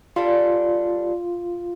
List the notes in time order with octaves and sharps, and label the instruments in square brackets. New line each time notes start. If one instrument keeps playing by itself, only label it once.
[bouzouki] G3 D4 A4 [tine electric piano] F4